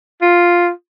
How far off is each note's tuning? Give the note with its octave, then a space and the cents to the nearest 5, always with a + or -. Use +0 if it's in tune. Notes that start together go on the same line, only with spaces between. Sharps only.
F4 +0